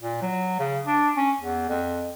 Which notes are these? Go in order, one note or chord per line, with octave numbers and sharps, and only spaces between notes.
A#2
F#3
C#3
D4
C#4
E2
F2